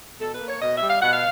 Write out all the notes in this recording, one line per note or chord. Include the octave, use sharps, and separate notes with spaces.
B2 A4
B4
A#3
C#5
B2 D#5
E5
G3
F5
B2 F#5
F5